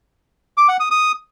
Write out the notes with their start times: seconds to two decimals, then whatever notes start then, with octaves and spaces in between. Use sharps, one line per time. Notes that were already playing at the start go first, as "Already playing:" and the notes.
0.57 D6
0.69 F#5
0.80 D#6
0.91 D#6